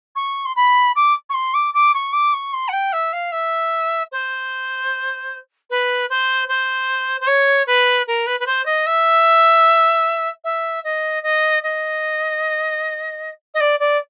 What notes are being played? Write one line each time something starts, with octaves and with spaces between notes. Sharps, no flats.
C#6
C6
B5
D6
C#6
C6
D6
D6
C#6
D6
C#6
C6
F#5
G5
E5
F5
E5
C5
B4
C5
C5
C5
C#5
B4
A#4
B4
B4
C5
D#5
E5
E5
D#5
D#5
D#5
D#5
D5
D5